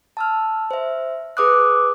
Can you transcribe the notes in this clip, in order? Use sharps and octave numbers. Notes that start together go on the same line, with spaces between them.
A5 E6 F6
C5 E5
G#4 B4 D6 D#6 F#6